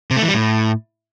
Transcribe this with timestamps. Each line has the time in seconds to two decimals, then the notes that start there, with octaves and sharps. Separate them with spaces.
0.11 C3
0.16 A3
0.22 E3
0.28 G3
0.34 A2